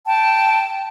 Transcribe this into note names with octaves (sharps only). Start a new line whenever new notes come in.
G5 A5